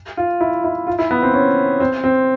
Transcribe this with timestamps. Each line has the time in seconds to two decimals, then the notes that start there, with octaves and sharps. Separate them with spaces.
0.17 F4
0.41 E4
0.64 E4
0.87 F4
0.99 E4
1.11 B3
1.22 C4
1.33 C#4
1.80 C4
2.04 C4